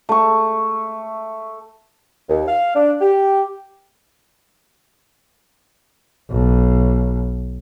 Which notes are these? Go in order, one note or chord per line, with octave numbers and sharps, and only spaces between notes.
A3 C#6
D#2
F5
D4
G4
B1